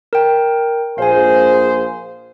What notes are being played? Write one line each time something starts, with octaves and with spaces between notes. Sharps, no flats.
A#4 G5
A#1 G#4 C5 F5 G#5